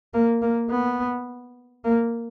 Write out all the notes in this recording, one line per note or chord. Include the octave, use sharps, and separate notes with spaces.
A#3
A#3
B3
A#3